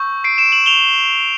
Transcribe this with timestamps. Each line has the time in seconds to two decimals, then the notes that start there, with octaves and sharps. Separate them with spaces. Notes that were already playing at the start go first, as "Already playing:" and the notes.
Already playing: C#6 E6 G6
0.24 C7 D7
0.38 D7 E7
0.52 E7 F#7
0.66 F7 G7